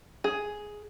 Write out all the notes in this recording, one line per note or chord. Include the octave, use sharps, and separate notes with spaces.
G#4